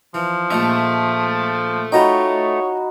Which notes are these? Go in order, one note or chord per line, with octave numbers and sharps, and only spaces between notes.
E3 F3
A#1 A3 D#4 A4 E5
D#4 F4 F#4 C#5 D#5 G5 B5